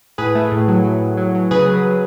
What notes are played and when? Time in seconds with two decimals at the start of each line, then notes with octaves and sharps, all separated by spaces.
0.18 A2 G#4 B4
0.35 A3
0.52 A2
0.68 F#3
0.84 F#3
1.01 A2
1.17 F#3
1.35 F#3
1.51 C#3 G#4 B4
1.68 F#3
1.84 F#3